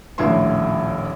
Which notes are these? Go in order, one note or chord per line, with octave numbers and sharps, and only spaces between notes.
D#1 A#1 A2 E4 E5 C6